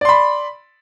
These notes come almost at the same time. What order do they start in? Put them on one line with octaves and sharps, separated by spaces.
D5 C6 B5